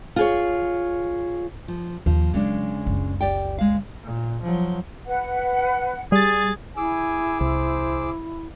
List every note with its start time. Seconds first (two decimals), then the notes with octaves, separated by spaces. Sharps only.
0.16 F4 G#4 C#5
1.68 F3
2.06 D#2 F3
2.34 C#3 F#3 G#3 D4
2.86 F#1 C#2
3.21 G4 D5 G5
3.58 G#3 F5
4.04 A#2
4.43 F3 F#3
5.06 B4 F#5
6.12 G3 G#4 A6
6.77 E4 G#4 G#5 D6 E6
7.41 C2 C5